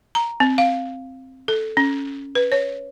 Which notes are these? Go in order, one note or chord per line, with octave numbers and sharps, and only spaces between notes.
A#5
C4
F5
A4
C#4
B4
C#5